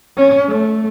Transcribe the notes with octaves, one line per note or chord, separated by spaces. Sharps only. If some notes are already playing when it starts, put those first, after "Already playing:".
C#4
A3